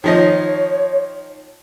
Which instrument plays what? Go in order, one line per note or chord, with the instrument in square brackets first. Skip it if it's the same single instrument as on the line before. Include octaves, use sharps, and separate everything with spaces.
[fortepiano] D#3 F3 D#5 [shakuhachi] C#5